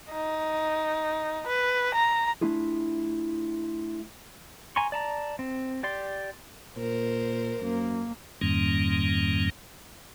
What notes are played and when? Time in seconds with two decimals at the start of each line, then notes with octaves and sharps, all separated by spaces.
0.12 D#4
1.47 B4
1.94 A#5
2.41 A3 D4 E4 F4 G#4
4.76 G#5 A#5 C6 C#6
4.92 D5 A5 A#5
5.39 C4
5.83 G4 D5 C6
6.77 A#2 A#4 C5
7.60 F#2 A#3
8.41 F2 G#2 D#3 G3 A#3 C#4